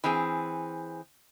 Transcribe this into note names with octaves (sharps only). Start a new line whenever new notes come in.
E3 C4 G#4